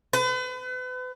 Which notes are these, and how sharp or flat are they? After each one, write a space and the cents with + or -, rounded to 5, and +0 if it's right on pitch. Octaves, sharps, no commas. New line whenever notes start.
B4 +40